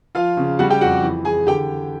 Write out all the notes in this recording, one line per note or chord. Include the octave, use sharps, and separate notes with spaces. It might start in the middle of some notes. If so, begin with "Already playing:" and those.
F3 F4 F5
C#3
G3 F#4 F#5
G4 G5
F2 F#4 F#5
E3
E3 G#4 G#5
D3 G4 G5